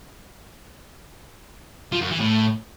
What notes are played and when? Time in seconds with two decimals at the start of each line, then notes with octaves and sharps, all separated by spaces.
1.92 F3
2.01 F#2
2.10 E3
2.20 A2